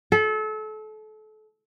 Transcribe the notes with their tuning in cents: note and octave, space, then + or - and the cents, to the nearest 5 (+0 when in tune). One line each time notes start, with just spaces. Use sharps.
A4 -30